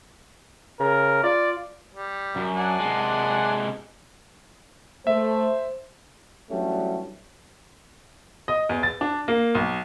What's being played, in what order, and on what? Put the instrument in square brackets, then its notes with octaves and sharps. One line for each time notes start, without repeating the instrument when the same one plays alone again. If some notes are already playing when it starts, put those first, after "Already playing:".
[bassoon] C#3 [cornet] A#4
[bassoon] F4 [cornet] D5
[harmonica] G3
[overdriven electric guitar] F#2
[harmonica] D4 F#5 G#5
[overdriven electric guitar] C3 G#3
[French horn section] A3 [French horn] C5 [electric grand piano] E5
[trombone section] E3 F#3 G3 A3 C#4 D4
[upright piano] D#5
E2
A6
D4
A#3
B1